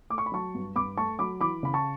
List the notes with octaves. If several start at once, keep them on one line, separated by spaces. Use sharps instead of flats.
A3 D6
C#6
B5
F#3 A5 C#6
G2
G2 B5 D6
A3 A5 C#6
F#3 B5 D6
E3 B5 D6
C#3 B5
A5 C#6